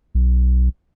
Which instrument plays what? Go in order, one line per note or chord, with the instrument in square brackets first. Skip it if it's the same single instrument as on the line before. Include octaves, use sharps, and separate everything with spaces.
[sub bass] B1